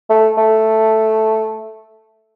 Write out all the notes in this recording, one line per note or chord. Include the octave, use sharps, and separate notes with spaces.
A3
A3